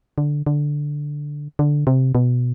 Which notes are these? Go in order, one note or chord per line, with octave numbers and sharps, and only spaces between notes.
D3
D3
D3
C3
B2